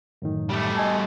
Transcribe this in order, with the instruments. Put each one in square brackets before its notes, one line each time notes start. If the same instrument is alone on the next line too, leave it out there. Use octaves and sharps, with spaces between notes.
[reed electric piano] F#2 A2 D#3
[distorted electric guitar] G3 A3
[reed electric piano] D#5 G#5 A5